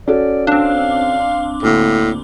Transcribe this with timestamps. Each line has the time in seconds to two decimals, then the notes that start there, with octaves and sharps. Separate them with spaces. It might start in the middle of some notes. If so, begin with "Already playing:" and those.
0.08 C#4 F#4 A4 D5
0.47 C4 D4 F5
1.63 D2 A2 A#3